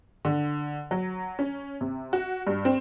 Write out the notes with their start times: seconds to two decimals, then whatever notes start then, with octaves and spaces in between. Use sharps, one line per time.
0.25 D3
0.91 F#3
1.39 C#4
1.81 C3
2.13 F#4
2.47 G2
2.65 C4